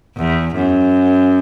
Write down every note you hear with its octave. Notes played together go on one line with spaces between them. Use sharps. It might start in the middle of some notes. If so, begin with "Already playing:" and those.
E2
F#2